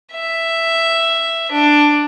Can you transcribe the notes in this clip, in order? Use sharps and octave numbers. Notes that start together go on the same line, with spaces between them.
E5
D4